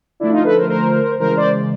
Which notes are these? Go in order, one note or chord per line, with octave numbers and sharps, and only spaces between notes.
D3 F3 A3 D4 E4
D#4 F4
A4 B4
A#4 C5
A#4 C5
C#3 E3 G#3 A#4 C5
C5 D5